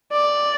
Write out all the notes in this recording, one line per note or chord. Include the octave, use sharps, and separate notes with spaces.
D5